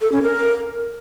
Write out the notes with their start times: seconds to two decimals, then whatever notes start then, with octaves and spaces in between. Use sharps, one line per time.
0.01 A4
0.12 C#4
0.23 A#4